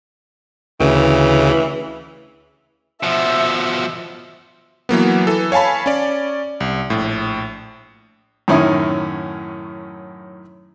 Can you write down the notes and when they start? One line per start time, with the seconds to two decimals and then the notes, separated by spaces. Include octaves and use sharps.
0.80 D2 C#3 E3
3.03 B2 F3 E5
4.89 E3 F#3 A#3 B3
5.27 E3 A4
5.52 C#5 F5 G#5 A5 B5
5.86 C#4 D5
6.60 C2
6.90 A#1 A2
8.48 F#2 A2 D#3 C#4 E4